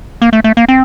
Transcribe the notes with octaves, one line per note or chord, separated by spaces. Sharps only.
A#3
A3
A3
A#3
C4